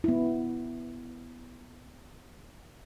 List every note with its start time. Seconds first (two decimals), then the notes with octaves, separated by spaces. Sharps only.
0.04 B3 E4